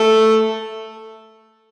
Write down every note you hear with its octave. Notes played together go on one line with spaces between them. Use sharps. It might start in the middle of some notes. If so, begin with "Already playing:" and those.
Already playing: A3 A4